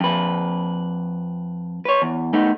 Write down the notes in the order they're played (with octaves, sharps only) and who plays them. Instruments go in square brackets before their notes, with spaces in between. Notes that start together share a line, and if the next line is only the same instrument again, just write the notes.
[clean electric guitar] F2 B4
B4 C#5
E2
A3 B3 D#4